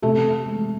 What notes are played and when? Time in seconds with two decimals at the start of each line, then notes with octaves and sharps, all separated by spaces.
0.02 C3 A3 A4
0.46 G#3